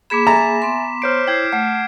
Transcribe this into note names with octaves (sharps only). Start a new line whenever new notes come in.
A#3 G#4 B5 D6 B6 E7
E5 G#5 A#5 A6
B3 C6
C5 C#5 F6 G6 C7 D7
E4 G5 G6 G#6 C7
A3 F#5